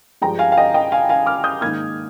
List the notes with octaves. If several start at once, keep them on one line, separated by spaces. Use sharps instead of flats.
G2 F3 G#3 G5 A#5
F5 G#5
F5
D#5 G5
D#5 G5
F5 G#5
F5 G#5
D6 F6
D#6 G6
G#2 D#3 A#3 F6 G#6